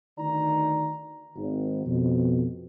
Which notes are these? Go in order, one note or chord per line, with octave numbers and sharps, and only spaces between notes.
D2 D#3 D#4 D5 A#5
G#1
F2 B2